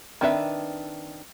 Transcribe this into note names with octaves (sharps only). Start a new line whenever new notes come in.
D#3 C4 D4 B4 E5